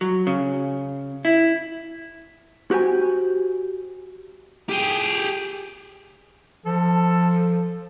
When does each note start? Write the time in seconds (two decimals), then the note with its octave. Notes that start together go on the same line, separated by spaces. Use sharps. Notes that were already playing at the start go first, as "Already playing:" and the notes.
0.01 F#3
0.27 C#3
1.25 E4
2.71 F#4 G4 C5 G#5
4.69 G4 G#4
6.66 F3 A4